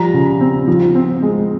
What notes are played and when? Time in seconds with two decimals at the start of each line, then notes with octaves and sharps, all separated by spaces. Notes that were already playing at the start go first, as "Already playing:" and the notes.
Already playing: F3 G3 A#5
0.14 C#3
0.41 C4
0.67 F3
0.95 C4
1.22 G#3